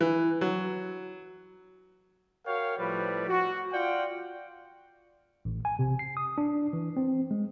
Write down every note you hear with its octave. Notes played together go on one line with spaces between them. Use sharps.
E3
F#3
F#4 A#4 C#5 F5 G5
A2 F3 G3 B4
F#4
F4 D5 F#5 G5
A1
G#5
C3
C7
D#6
D4
E3
C4
G#3